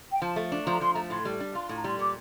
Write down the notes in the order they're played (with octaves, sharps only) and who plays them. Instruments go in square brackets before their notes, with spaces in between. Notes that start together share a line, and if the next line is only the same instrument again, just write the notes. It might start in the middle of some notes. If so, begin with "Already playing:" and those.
[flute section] G5
[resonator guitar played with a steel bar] F3 [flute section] A5
[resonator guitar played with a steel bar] A3
D4
[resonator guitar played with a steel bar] F3 [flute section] A#5
[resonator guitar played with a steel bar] F3 [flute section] C6
[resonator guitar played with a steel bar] A3 [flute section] A#5
[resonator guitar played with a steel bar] A2 [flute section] C6
[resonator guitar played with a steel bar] G3
D4
[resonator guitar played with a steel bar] F4 [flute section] C6
[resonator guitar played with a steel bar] A2
[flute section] A#5
[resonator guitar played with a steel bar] G3 [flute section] C6
[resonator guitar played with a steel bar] A#2 [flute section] D6